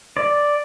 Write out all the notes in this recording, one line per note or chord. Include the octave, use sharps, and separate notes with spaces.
D5